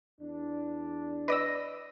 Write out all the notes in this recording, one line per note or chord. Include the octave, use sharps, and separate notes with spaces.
E2 D4
B4 D5 D#5 E6 A#6